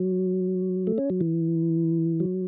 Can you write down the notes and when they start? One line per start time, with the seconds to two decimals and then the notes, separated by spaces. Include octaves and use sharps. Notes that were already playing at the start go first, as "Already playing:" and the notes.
Already playing: F#3
0.87 A3
0.98 C#4
1.10 F#3
1.20 E3
2.20 F#3